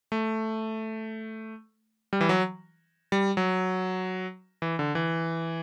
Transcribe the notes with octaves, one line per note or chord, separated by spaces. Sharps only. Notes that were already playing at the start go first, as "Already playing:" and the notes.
A3
G3
E3
F#3
G3
F#3
E3
D3
E3